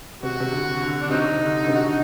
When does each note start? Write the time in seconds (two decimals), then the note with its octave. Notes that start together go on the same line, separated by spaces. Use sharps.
0.23 C3 F#4
0.40 C3
0.52 D3
0.81 D3
1.01 D4
1.10 C3 F#3 C4 D#4
1.39 D3
1.63 D3
1.68 C3
1.75 F#4
1.87 D#4